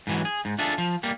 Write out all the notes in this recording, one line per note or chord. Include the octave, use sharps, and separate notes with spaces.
G#2 E3 F#3
G#4
G#2
D4 F4 G#4 A4 E5
F3
G3 A#3